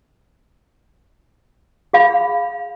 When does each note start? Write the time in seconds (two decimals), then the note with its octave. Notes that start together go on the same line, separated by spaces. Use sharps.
1.93 G#4 F5 B5